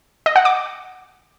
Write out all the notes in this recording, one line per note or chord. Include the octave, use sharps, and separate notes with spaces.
D#5
F#5
D6